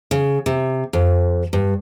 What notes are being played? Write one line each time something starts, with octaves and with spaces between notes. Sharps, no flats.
C#3
C3
F2
G2